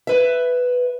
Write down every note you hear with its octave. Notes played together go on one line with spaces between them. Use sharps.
B4 E5